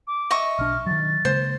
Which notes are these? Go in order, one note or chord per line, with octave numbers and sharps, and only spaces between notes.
D6
D#5 E5 C#6
B1 D4 F6
D#3 F#3 A6
C#3 G#3 A#3 C5